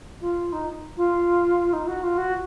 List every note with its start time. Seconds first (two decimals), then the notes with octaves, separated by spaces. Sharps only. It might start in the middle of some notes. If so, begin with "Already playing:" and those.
0.21 F4
0.52 D#4
0.97 F4
1.73 D#4
1.87 F#4
2.03 F4
2.17 F#4